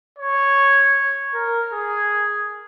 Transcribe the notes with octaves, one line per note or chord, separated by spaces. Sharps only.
C#5
A#4
G#4